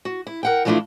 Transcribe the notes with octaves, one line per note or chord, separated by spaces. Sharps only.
F#4
E4
A#4 F#5 G5
E3 F3 A3 D4 E4 F4